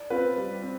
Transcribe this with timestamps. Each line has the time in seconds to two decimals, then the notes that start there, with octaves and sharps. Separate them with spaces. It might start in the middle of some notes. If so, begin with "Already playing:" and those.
Already playing: D5
0.10 C4 F4 B4
0.36 G3
0.62 C4